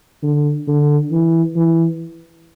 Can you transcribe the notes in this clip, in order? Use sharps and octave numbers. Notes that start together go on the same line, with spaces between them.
D3
D3
E3
E3